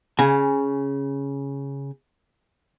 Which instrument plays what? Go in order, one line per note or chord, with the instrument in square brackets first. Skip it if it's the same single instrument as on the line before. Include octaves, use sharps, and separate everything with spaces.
[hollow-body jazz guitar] C#3 G#5